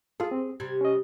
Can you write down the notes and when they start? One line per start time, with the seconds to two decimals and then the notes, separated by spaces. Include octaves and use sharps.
0.20 F4 G#4 A4
0.31 C4
0.60 C3 G3 G#6
0.81 C#4 D#5